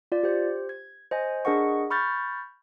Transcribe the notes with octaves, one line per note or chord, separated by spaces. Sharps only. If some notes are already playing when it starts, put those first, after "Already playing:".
F4 D5
G4 C5
G#6
C5 D#5 G#5
D4 G#4 A#4 D#5 F#5 C#6
B5 C#6 F6 G6 A6